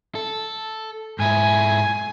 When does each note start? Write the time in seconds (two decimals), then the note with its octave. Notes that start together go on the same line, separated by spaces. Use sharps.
0.15 A4
1.19 G#2 E4 G#5